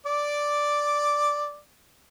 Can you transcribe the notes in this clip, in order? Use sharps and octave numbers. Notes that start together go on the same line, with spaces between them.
D5 D6